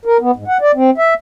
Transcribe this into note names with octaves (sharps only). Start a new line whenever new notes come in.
A#4
B3
G#2
F#5
D5
C4
E5